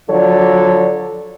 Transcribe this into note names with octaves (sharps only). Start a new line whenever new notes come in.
D3 F3 F#3 A4 C#5 D5